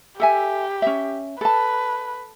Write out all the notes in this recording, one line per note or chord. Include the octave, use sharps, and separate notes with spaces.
G4 A4 E5 G#5
C#4 E5
A4 B4 A5